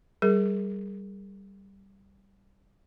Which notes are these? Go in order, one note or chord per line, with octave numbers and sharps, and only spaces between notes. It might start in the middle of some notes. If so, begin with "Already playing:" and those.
G3 G#4 A#4